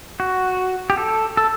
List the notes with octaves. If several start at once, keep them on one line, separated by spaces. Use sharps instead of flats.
F#4
G4
A4
A4